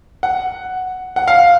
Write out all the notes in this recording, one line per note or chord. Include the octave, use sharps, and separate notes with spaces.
F#5
F#5
F5